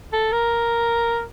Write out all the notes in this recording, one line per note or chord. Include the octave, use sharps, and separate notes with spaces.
A4
A#4